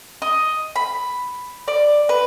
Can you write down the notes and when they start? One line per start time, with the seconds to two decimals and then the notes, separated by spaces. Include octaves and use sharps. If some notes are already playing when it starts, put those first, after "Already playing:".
0.22 D#5
0.76 B5
1.68 D5
2.09 B4